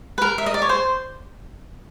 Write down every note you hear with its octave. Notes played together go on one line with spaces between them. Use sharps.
B4
A#4
E5
D#5
D5
C#5
C5